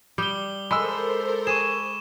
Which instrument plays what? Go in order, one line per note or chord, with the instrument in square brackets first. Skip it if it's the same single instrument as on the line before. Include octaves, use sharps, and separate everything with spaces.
[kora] G3 G5 [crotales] D6 D#6 G7
[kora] G#3 [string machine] A4 A#4 C5 [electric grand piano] B5 E6
[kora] G#4 [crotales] C#6 D#7 E7